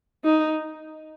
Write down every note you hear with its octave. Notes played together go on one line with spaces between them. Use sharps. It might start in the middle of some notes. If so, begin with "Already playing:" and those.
D#4